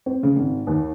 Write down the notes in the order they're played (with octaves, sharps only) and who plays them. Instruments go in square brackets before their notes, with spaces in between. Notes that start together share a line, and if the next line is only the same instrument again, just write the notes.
[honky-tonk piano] C4
C#3
G#1
D#2